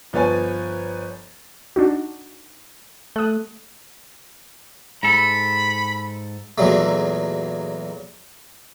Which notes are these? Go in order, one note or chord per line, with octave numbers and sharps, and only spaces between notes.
G1 F3 B4 C#5 G#5 A6
D4 D#4 F#4
A3 D#6 F#6
G#2 A4 B5
E2 A#2 F#3 G#3 A3